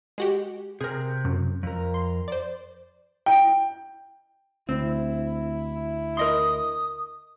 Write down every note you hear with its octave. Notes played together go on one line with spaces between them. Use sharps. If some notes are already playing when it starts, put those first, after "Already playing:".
G#3 F#4 G4
C3 G#4 A#4
F#2
F2 A#4
C6
C5 D5
G5
D2 C4 E4
A#4 D#5 C6 D#6